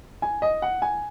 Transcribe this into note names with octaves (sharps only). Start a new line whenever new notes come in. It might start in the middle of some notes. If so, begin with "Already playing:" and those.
G#5
D#5
F#5
G#5